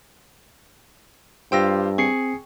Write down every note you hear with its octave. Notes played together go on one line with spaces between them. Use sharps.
G2 F4 G4 C5 G5 E6 A#6
C4 G#4 C#6 C7 C#7